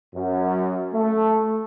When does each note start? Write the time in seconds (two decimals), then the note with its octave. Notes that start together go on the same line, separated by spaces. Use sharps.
0.15 F#2
0.94 A3